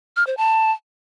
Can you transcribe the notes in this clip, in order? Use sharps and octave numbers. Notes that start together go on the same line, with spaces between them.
F6
C5
A5